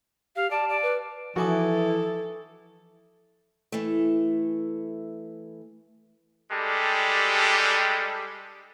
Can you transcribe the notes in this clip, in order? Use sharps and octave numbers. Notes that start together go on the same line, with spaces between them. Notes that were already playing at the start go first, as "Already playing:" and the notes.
G4 F5
D5 A5
D5
B4
E3 F3 F#4 A4 G#5 D6 D#6
E3 A3
G3 G#3 D4 G4 A4